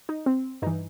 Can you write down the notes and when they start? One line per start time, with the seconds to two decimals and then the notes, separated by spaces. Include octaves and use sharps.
0.09 D#4
0.26 C4
0.62 G2 E3 D#4